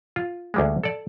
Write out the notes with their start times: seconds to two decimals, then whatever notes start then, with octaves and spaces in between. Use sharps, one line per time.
0.16 F4
0.54 D2 G3 G#3
0.84 A4 D5